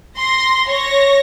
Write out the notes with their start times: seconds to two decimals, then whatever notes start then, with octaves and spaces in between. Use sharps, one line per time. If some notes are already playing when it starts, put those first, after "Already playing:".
0.16 C6 A#6
0.67 C#5 A#6